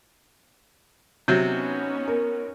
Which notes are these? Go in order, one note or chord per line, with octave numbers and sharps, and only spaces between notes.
C3 F#3 B3 C#4 D#4 G6
A#4